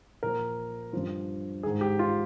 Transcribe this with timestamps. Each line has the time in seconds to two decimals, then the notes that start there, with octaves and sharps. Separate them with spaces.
0.23 A#2 F3 A#4
0.93 G2 F3
1.63 G#2 D#3 G#4
1.81 G4
1.99 F4